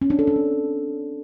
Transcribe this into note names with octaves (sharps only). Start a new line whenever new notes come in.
C#4
D4
A4
D4
C4